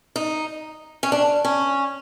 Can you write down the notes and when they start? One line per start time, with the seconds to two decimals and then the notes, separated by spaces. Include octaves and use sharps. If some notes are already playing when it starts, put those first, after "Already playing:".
0.16 D#4
1.03 C#4
1.12 D4
1.45 C#4